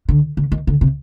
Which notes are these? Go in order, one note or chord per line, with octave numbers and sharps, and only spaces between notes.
D3
D3
D#3
D3
C3